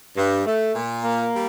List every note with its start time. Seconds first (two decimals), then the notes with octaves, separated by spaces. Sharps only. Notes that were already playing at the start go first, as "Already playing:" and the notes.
0.17 G2
0.46 A3
0.75 A#2
1.03 A#3
1.33 G3